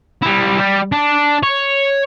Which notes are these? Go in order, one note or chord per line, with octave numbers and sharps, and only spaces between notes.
G3 E4
G3
D4
C#5